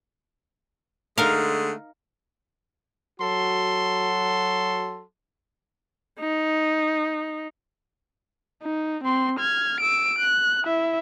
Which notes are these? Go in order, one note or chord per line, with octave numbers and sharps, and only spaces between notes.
D3 G#3 A3 D#4 A#4 F5
F#3 F#4 A4 C6
D#4
D#4
C4 C6
F6 G#6
E6 D7
F#6
E4 E5